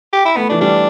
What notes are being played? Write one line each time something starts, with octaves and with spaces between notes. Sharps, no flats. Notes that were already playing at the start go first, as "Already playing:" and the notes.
G4
E4
A3 B3
E3 D4
G3 D4